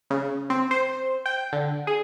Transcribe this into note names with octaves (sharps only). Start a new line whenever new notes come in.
C#3
C4
C5
G5
D3
G#4